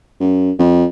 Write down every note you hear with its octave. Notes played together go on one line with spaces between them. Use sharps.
F#2
F2